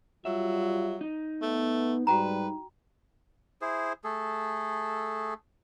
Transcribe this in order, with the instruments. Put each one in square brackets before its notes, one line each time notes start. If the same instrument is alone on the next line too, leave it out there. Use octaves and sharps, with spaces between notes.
[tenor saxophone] F#3 [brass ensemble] G3 F4 [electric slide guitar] E5
[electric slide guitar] D#4
[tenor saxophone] A3 [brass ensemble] B3
[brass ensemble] G#2 G3 [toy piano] F#4 G5 A#5 [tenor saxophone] B4
[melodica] E4 G#4 C5
A3 G#4 A4